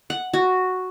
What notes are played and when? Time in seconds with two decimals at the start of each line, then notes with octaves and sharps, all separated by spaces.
0.10 F#5
0.33 F#4